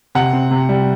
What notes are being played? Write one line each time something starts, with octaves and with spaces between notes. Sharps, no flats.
C3 F#5
C4
C3
G3